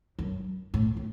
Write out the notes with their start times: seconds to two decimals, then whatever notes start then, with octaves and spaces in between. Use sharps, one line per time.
0.19 F#2
0.74 A2
0.97 A2